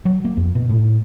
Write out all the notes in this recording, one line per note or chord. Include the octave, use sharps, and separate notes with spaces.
F#3
A#3
F2
B2
A2